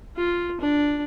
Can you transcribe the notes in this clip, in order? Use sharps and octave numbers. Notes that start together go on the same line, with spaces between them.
F4
D4